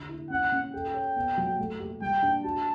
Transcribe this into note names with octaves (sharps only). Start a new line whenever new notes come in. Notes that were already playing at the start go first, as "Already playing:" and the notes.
Already playing: D3
E4
C#4 F#5
C#4
A4 G5
C#5
B3
F#3
A3
G4
G3 G5
D4
F#4 A5